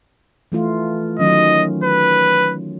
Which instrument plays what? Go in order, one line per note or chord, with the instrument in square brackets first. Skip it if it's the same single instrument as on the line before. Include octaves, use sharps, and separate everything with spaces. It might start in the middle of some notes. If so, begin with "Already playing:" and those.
[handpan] E3 A3 F4
[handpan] D#3 F#3 C#4 [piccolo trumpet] D#5
[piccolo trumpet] B4